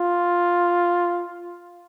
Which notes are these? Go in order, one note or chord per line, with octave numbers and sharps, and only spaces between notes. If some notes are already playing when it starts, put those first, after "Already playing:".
Already playing: F4